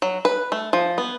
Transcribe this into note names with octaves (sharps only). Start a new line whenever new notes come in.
F#3
B4
A3
F3
B3